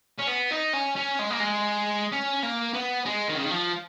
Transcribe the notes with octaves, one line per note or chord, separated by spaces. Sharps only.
C#4
B3
D#4
C#4
C#4
G#3
A#3
G#3
C#4
A#3
B3
G#3
D#3
C#3
D#3
F3